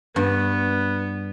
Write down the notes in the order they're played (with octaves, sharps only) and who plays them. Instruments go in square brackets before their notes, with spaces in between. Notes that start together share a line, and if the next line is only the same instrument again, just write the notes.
[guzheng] G2 [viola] B3